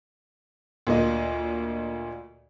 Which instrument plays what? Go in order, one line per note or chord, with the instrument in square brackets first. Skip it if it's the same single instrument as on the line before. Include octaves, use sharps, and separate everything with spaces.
[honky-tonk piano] D2 A#2 A#3 D#5